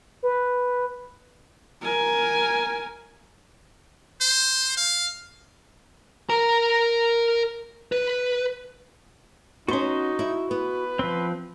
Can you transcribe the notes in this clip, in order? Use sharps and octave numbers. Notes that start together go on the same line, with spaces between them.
B4
A#4 G#5
C5
F5
A#4 A#5
B4
B3 C#4 D#4 F#4 C6
E4
B3 B4
F3 C4